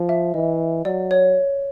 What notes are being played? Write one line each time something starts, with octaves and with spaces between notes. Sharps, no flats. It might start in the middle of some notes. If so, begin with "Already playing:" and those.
Already playing: F3
E5
E3 D#5
F#3 D5
C#5